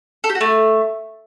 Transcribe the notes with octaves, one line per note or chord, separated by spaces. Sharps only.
A4
G4
F#4
A3